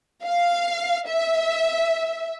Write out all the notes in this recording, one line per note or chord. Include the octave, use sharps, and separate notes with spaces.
F5
E5